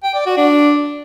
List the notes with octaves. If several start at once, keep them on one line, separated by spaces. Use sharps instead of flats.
G5
D5
F#4
D4